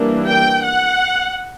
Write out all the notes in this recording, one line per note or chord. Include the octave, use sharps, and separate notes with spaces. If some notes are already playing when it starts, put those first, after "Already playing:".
Already playing: E3 G3 A#3 D4
G5
F#5